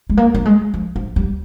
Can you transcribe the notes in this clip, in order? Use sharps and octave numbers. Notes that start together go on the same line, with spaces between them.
G#3
A#3
G3
G#3
F3
F3
G3